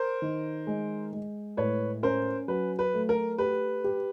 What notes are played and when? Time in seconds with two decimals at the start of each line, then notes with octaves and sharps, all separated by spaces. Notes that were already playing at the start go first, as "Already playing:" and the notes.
Already playing: A#4 C5
0.22 D#3
0.67 G#3
1.13 G#3
1.57 A2 B4 C#5
2.03 C#4 A#4 C5
2.48 F#3 B4
2.79 B4
2.94 A3
3.09 A#4
3.38 G4 B4
3.84 G4